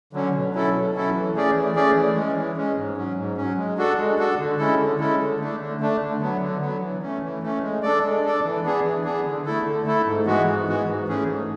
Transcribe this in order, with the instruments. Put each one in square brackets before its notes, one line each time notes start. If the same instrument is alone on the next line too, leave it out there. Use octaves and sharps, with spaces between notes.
[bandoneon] D3 F#3 C#4
B2
F#3 C#4 E4 A4
B2
F#3 C#4 E4 A4
E3
A3 C#4 G#4 D5
E3
A3 C#4 G#4 D5
E3
G#3 C#4
E3
G#3 C#4
G#2
F#3 C#4
G#2
F#3 C#4
G#3
D4 F#4 A4
G#3
D4 F#4 A4
D3
G#3 C#4 E4 A4
D3
G#3 C#4 E4 A4
D3
A3 D4
D3
A3 D4
D3
F#3 B3
D3
F#3 B3
E3
A3 C#4
E3
A3 C#4
G#3
D4 A4 D5
G#3
D4 A4 D5
E3
B3 D4 G#4
E3
B3 D4 G#4
D3
A3 E4 A4
D3
A3 E4 A4
G#2
E3 G#3 B3 F#4
G#2
E3 G#3 B3 F#4
G#2
E3 A3 C#4 G#4
G#2